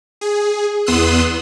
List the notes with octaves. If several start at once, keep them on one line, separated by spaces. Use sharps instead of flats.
G#4
E2 B3 C6 D#6 E6 F#6